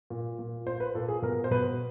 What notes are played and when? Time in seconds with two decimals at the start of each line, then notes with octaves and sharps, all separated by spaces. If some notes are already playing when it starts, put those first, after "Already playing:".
0.10 A#2
0.39 A#2
0.66 A#2 C5
0.80 B4
0.95 A#2 A4
1.08 G#4
1.22 B2 A#4
1.44 C5
1.51 B2 B4